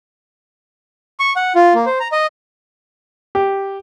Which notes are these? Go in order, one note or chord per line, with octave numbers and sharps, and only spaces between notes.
C#6
F#5
F4
A#3
C5
A#5
D#5
G4